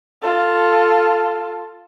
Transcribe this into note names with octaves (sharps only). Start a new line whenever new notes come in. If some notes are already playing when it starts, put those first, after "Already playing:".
F4 A4